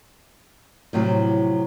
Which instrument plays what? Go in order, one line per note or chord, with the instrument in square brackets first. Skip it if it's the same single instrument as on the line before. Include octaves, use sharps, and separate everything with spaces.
[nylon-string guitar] A2 C3 F3 F#3